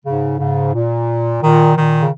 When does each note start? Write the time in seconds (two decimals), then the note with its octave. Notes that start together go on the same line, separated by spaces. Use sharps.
0.05 G#2 C#3
0.39 G#2 C#3
0.74 A#2
1.42 A#2 D#3
1.76 A#2 D#3
2.01 C#3